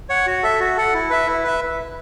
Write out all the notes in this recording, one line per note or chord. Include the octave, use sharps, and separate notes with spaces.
C#5 F#5
F#4
A4 E5
F#4
A4 F#5
E4
B4 E5
E4
B4 E5